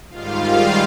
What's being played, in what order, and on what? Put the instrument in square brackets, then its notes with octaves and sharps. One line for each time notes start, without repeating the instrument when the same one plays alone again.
[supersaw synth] G#2 D#3 G3 F4 F5